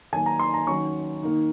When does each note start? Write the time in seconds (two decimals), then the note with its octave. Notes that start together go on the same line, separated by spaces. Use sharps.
0.13 D#3 F#3 A#3 D#4 G#5
0.26 A#5
0.39 C6
0.54 A#5
0.67 D#3 F#3 C#4 C#6
1.23 D#3 A#3 D#4